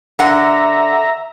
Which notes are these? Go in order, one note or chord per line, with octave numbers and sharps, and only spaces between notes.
D3 E5 F#5 A#5